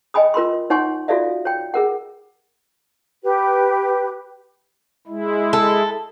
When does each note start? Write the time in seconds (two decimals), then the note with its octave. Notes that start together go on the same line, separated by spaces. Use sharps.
0.14 D#5 G5 G#5 B5 D#6
0.34 F4 A#4 B5 C6
0.70 D#4 C#5 F#5 G#5 C6 C#6
1.08 F4 F#4 A4 D5 E5 F5
1.45 C#5 G5
1.74 G#4 A#4 F#5
3.23 G4 B4
5.07 G#3 E4
5.53 A4